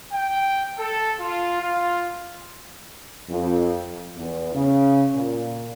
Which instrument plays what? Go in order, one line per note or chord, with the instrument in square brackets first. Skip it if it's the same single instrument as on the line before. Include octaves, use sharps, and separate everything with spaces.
[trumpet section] G5
A4
F4
F4
[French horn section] F2
E2
C#3
A#2